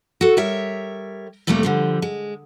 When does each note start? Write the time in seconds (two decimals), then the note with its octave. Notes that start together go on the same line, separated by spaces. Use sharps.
0.21 F#4 A4
0.37 G3 A#4 C#5 E5
1.47 F2 C3 G3 A3 A#3 C4
1.63 D3 F3 G3
2.02 G#3